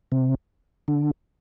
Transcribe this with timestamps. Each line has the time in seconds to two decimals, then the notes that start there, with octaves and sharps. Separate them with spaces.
0.12 C3 C4
0.88 D3 D4